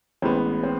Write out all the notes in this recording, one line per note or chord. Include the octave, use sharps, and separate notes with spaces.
A1 A2 G#3 B3 C4
C4